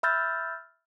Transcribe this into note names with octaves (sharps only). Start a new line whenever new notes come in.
E5 B5 E6 F6 G6 A6